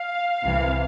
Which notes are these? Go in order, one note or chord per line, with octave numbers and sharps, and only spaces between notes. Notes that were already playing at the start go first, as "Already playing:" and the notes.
Already playing: F5
C2 C3 E3